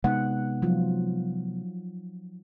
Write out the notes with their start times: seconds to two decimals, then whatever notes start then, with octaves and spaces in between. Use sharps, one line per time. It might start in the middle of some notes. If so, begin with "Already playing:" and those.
0.04 C3 G#3 B3 D#4 F#5
0.62 F3 F#3 F4